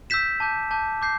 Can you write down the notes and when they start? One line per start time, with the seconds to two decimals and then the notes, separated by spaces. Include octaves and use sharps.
0.10 E6 G6 B6 E7
0.40 A5 D6 G6
0.71 A5 D6 G6
1.02 D6 G6 C7